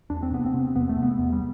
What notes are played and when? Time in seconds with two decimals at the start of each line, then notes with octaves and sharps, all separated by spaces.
0.10 E2 D4
0.23 C4
0.32 C3 B3
0.46 C4
0.54 C3
0.76 E2 B3
0.89 A3
0.97 C3
1.03 B3
1.19 E2
1.32 G3